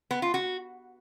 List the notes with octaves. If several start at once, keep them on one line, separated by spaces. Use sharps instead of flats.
B3
F4
F#4